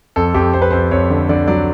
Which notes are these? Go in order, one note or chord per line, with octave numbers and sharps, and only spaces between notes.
F2 A4
F2 G4
F2 C5
B4
F2 C5
F2 C#5
D3
D3 D5
F#3 D5